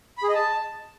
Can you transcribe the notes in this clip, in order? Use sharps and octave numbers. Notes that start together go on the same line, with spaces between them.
B5
G#4
D#5
A5